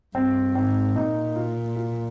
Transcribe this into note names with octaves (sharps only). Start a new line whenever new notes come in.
G2 C4
G#2 C4
A#2 D#4
F4
F4